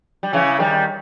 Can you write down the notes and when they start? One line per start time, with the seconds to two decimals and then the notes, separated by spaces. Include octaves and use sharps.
0.23 G3
0.33 C#3 E3
0.60 D#3 G3